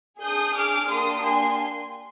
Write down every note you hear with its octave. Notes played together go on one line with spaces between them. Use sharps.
D4 G#4 D#6 G6
D6 F6
A#3 D4 G4 C6 D#6
G#5 C6